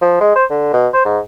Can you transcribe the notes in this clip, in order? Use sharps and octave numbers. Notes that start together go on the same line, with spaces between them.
F3
G#3
C5
D3
B2
C5
G#2